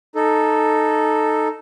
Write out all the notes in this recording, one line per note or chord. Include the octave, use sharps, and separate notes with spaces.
D#4 A4